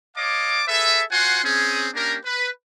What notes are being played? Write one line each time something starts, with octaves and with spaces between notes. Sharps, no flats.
C#5 D#5 F5 A5 D6
G#4 A4 B4 E5
F4 F#4 C5 F#5 G#5 C6
C4 C#4 G#4
A#3 C#4 D4 G4 A#4
B4